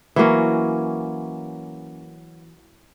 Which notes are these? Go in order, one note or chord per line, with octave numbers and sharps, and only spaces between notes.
E3 F#3 A#3 C#4